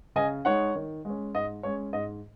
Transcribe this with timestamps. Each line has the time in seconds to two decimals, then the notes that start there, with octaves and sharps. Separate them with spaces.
0.16 C#3 D#5 G#5
0.45 G#3 D#4 C#5 F#5
0.75 D#3
1.05 G#3 C#4
1.34 G#2 D#5
1.63 G#3 C#4 C#5
1.93 G#2 D#5